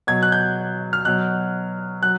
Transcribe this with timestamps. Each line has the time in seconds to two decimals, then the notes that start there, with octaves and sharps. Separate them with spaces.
0.07 B2 F#3 G#6
0.23 F#6
0.32 G6
0.93 F6
1.05 B2 F#3 F#6
2.02 F#3 F#6